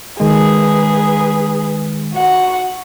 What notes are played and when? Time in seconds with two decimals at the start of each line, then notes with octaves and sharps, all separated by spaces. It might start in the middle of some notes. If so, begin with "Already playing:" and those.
0.20 D#3 G#3 G#4 B4
2.14 F#4 F#5